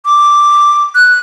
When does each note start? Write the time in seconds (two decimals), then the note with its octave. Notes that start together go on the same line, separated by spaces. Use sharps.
0.05 D6
0.95 F#6